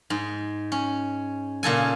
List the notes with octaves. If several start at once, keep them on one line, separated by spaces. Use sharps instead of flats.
G#2
C#4
A#2 C#3 A4 G#5